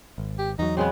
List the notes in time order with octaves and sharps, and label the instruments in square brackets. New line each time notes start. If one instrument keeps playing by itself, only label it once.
[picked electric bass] G#1
[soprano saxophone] G4
[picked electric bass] E2 F#3 [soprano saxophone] D#4
[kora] C#3 G#3 B3 [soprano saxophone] C4